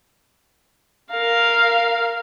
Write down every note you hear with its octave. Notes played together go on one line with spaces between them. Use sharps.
A#4 F5